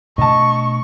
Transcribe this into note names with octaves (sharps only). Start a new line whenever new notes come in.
B2 A3 D4 D#5 A5 C#6